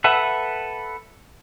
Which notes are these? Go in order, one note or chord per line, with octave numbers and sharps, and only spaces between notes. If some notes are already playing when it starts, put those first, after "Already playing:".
A4 B4 E5 F#5